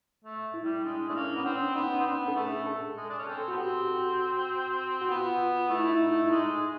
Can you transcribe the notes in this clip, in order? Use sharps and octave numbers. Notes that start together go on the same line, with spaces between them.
A3
E4
G3
G#3 D4
A3 D4
A#3 C#4
B3
C4 C#4
B3 D#4
C4
B3 D4
A4
A3 G#4
A4
G#3
D4
C#4
C4 A4
B3 F#4
C4 G4
F#4
F#4
B3 F4
A3 E4
E4
D#4
D#4
E4
G#3 D#4
G#3